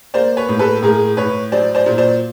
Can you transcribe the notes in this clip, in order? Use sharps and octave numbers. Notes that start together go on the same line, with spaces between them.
A#3 C5 D5
B4 C#5
A2
A4 B4
A2 G#4 A#4
A2 B4 C#5
F#3 C5 D5
C5 D5
A#2
C5 D5